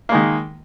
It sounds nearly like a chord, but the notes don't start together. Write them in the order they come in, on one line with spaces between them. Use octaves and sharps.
A#3 G#3 D#3